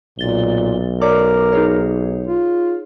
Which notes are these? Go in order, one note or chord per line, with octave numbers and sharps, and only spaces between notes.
B1 A#2 A6 G7
A#4 C#5 D5 D6
D#4 G#4 C#5
F4